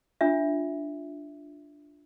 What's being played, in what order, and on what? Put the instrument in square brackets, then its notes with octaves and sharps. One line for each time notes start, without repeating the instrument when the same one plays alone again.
[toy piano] D4 F4 E5